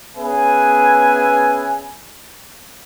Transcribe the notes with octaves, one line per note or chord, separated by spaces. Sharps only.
B3 C#4 G#4 B4 E5 G#5